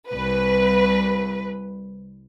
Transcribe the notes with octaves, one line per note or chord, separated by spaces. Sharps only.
C2 B4